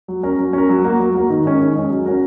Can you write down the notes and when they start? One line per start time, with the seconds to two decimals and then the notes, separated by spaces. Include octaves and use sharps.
0.08 F#3
0.23 C#4 A#4
0.39 F#3
0.53 C#4 A#4
0.69 F#3
0.84 A#3 F#4 A#4
0.99 F#3
1.14 A#3 F#4 A#4
1.30 D#3
1.45 G#3 C#4
1.59 D#3
1.75 G#3 C#4
1.90 F#3
2.06 C#4 F#4 A#4